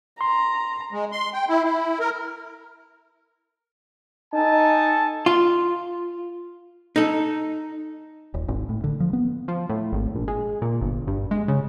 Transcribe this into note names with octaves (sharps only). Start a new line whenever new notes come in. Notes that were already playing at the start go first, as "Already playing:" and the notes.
A#5 C6
G#3
C6
G5
E4
E4
A#4
D#4 A4 G#5 A5
F4
D#4 A4
D#1
G#1
A2
D3
F3
B3
F3
A2
G#1
A#1
G#3
A#2
G1
G2
G#3
C#3